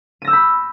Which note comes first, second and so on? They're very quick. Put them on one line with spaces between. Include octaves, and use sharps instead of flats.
D#7 A#6 E6 G6 B5